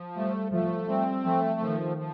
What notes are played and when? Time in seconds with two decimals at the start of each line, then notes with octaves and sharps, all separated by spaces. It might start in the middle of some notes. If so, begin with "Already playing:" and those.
Already playing: F3
0.16 G3 A3
0.52 F3 A3
0.88 G3 C4
1.24 F3 A3
1.60 D#3 F3
1.97 F3